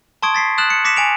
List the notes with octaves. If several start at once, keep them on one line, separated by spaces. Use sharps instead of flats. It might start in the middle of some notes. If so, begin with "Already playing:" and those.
A5 C6 C#6 D#6 G#6 D7
A6 B6 C7
D#6 F6 F#6 A6 E7 F#7
C#7
D6 A#6 B6 C#7 E7
G#5 D7 F7